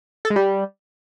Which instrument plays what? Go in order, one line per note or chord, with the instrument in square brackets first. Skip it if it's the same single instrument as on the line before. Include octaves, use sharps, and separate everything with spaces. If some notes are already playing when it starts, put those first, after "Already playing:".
[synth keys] A4
G#3
G3